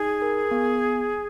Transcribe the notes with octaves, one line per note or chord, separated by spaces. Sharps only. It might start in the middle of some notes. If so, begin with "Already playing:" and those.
Already playing: D#4 G#4
A#4
B3